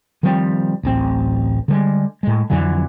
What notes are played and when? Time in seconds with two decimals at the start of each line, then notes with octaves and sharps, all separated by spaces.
0.23 D#3 F3 G3 C4
0.83 D1 A1 C4
1.68 D3 G3 G#3
2.23 A2 G#3
2.50 F2 D3 E3 F#3